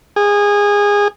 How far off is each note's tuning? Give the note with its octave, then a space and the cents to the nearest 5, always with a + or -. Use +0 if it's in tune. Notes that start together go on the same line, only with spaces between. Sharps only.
G#4 -20